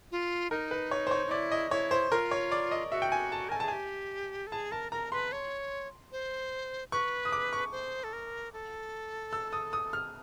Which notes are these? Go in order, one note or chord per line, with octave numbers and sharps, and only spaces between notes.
F4
D#4 A#4
B4
C#5
C5
C#5
D#4
E4 D5
D#5
E4 C#5
C5
F4 A#4
C#5
D5
D#5
F#4 E5
G5
G#5
A5
A#4 G#5
A4
A5
G#4
G4 G#5
A4
G#4 A5
A#4 A5
A#4 A#5
B4 C6
C#5
C5
B4 C#6
D#6
D6
C#6
C5
A4
A#4
A4
E6
D#6
D#6
F6